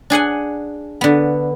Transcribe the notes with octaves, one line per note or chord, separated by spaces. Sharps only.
D4 G#4 F#5 G#5
D3 B3